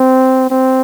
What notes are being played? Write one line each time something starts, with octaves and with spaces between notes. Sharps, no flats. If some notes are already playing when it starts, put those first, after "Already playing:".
Already playing: C4
C4